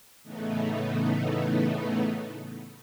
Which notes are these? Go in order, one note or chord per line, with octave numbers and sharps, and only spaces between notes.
A2 C#3 E3 A3 B3 D#4